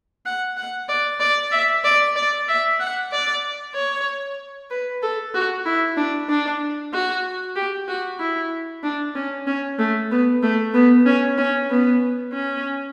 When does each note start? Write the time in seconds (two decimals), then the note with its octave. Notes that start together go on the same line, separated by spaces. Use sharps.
0.26 F#5
0.57 F#5
0.89 D5
1.20 D5
1.52 E5
1.84 D5
2.16 D5
2.48 E5
2.80 F#5
3.12 D5
3.75 C#5
4.70 B4
5.02 A4
5.34 F#4
5.66 E4
5.97 D4
6.29 D4
6.93 F#4
7.56 G4
7.88 F#4
8.20 E4
8.84 D4
9.15 C#4
9.47 C#4
9.79 A3
10.11 B3
10.42 A3
10.74 B3
11.06 C#4
11.38 C#4
11.70 B3
12.33 C#4